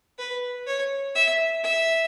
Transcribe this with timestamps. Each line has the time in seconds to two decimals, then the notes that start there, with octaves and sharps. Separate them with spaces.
0.18 B4
0.66 C#5
1.15 E5
1.63 E5